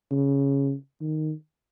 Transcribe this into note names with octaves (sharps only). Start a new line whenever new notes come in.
C#3
D#3